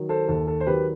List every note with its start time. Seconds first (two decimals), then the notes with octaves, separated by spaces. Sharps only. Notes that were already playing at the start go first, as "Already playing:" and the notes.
Already playing: D#3 F#3
0.09 A4 C5
0.28 D#2 A4
0.47 A4
0.60 C5
0.66 D#3 F#3 G4 B4